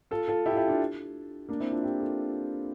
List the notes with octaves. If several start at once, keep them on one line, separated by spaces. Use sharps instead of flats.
F4 A4
F4 A4
E4 G4
F4
E4 G4
D4 F4
A#3 D4
C4 E4
D4 F4
E4 G4
F4 A4